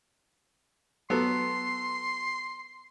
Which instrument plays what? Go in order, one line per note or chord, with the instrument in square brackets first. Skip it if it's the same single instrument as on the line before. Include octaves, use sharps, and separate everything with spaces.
[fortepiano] F#3 B3 A4 [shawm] C6